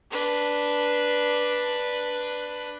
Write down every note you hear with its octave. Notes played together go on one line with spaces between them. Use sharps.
D4 B4